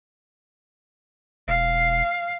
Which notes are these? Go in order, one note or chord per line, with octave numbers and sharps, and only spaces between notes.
E1 F5